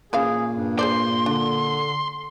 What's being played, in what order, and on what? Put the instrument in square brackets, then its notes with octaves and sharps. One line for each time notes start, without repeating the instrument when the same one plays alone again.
[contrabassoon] A#2 [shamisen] E3 C#4 F5 [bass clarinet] G#4
[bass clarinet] G2
[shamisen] G#4 C5 D5 [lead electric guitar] C6
[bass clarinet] D3 [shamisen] D4